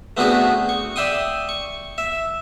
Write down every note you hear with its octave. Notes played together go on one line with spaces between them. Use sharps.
A3 B3 C4 D4 F#4 G#4
C#6
D5 E5 G5 C6 D#6
C#6
E5